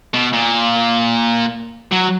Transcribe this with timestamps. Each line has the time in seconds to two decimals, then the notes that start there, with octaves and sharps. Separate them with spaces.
0.14 B2
0.33 A#2
1.92 F#3